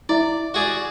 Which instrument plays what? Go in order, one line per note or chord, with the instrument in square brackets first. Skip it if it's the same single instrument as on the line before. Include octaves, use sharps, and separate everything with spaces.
[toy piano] E4 E5 [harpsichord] D5
[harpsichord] F#4 G#4 D5